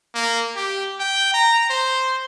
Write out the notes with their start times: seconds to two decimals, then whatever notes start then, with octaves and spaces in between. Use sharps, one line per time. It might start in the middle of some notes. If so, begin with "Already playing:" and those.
0.14 A#3
0.56 G4
0.99 G5
1.34 A#5
1.70 C5